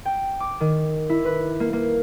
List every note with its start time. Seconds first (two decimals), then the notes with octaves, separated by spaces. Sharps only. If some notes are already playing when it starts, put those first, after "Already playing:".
0.05 G5
0.40 D6
0.60 D#3
1.09 E4
1.25 B4
1.60 A#3
1.73 A#3